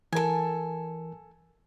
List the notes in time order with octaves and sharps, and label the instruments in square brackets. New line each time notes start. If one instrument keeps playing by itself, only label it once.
[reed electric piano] E3 A#4 [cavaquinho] A4 G#5